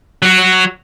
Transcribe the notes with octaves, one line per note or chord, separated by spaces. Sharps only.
F#3 F#4